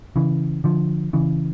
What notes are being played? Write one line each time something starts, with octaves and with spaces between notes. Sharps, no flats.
C#3 E3
D3 F3
C#3 E3